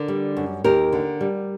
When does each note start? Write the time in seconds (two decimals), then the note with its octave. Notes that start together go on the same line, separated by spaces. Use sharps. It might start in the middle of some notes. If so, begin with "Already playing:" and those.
Already playing: D3 A#4
0.08 G3
0.37 F#2
0.64 D#2 G4 A#4
0.92 D3
1.21 G3